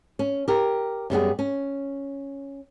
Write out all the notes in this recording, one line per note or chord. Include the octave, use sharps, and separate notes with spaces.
C#4
G4 A#4
F#2 G3 B3 G#4
C#4